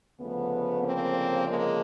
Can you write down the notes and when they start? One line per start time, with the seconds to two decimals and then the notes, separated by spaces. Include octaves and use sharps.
0.19 D2 C#3 F3 A3 B3
0.82 A#3 C4
1.46 G#3 A#3